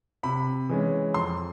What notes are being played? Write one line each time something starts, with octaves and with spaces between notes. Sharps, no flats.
C3 B5
E3 G#3 C#4
F2 C6